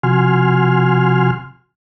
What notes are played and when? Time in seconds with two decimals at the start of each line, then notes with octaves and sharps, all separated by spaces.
0.03 C3 F3 F#4 G#5 C6 F6